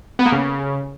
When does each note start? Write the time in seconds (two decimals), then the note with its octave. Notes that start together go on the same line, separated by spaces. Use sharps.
0.19 B3
0.26 A#3
0.32 C#3